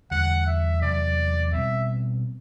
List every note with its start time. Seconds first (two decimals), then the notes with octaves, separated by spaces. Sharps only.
0.11 E2 D3 G3 F#5
0.47 E5
0.81 E2 C3 F#3 D5
1.53 B2 G3 C4 E5